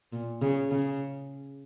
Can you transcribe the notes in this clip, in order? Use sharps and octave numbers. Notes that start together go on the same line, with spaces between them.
A#2
C#3
C#3